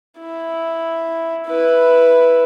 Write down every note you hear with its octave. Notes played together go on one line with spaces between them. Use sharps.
E4
E4 B4